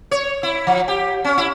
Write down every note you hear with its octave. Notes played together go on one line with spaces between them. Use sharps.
C#5
E4
F3
G4
C#4
E4